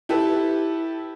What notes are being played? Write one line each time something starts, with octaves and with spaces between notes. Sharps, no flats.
E4 G4 A4 B4